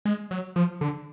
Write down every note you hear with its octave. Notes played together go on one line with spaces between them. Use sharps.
G#3
F#3
F3
D3